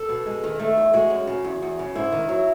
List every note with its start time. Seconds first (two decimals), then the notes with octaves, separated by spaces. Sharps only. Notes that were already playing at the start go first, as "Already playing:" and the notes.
Already playing: A4
0.09 B2
0.26 G#3
0.44 D#3
0.60 A3
0.77 E2
0.94 G#3 F#4
1.10 F#2
1.27 C#3
1.45 E2
1.62 E2
1.79 C#3
1.95 G#2 E4
2.12 D#3
2.29 F#3